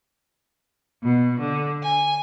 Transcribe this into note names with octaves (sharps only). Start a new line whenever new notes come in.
B2
D3
G#5